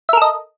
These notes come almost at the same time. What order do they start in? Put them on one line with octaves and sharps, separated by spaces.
E5 A#4 A4 D#5